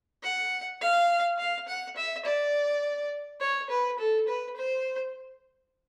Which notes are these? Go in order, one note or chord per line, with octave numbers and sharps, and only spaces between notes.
F#5
F5
F5
F#5
E5
D5
C#5
B4
A4
B4
C5